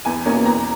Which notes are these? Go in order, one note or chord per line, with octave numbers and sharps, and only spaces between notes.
E2 G#5
B2 A#3 C#4
E2 A#5